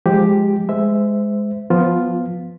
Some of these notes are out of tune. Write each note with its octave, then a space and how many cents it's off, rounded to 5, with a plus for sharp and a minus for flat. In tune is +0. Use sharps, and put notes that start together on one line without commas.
F3 +0 G#3 +0 G4 +0
G#3 +0 C5 -30 E5 +0
F3 +0 B3 +0 F4 +0